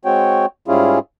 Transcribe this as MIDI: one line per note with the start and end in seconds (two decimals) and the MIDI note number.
0.05 0.46 56
0.05 0.46 60
0.05 0.46 66
0.05 0.46 73
0.05 0.46 79
0.68 0.99 44
0.68 0.99 55
0.68 0.99 61
0.68 0.99 64
0.68 0.99 65
0.68 0.99 68